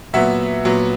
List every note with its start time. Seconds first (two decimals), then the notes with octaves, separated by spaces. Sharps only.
0.13 A#2 F#3 B3 E5 F#5
0.65 A#2 F#3 B3